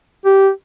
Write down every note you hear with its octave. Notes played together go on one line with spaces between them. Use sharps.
G4